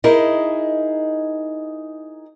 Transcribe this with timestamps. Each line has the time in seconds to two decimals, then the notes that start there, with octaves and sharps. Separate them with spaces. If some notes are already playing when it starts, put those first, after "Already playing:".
0.04 D#4 E4 G#4 A#4 D#5